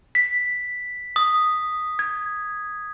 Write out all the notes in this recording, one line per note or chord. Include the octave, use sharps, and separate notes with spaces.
B6
D#6
G#6